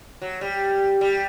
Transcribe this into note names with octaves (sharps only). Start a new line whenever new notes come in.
F#3
G3
G3